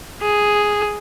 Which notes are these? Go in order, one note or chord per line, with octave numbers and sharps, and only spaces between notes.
G#4